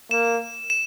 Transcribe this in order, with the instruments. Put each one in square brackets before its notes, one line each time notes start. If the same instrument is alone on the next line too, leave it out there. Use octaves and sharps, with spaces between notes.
[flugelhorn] A#3 [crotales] E7
[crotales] E7